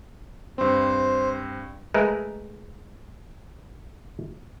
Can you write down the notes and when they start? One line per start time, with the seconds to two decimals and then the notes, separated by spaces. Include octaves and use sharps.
0.58 G2 C4 C5
1.94 G#3 A3 A#4 B4